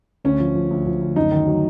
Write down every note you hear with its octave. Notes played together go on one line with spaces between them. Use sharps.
D2 C#4
F3
F3
D2
F3
D2
F#2 D#4
D#3
F#3